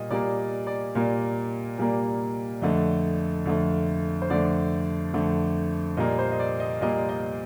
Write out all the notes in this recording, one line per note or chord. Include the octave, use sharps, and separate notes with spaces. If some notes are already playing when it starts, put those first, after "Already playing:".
Already playing: A#2 G3 A#3 D#5
A#2 G3 A#3 D5
D5
A#2 G3 A#3
A#2 G3 A#3
F2 D3 A3 D#5
F2 D3 A3
C5
F2 D3 A3 D5
F2 D3 A3
A#2 G3 A#3 D#5
C5
D#5
D5
D#5
A#2 G3 A#3 D#5
D#5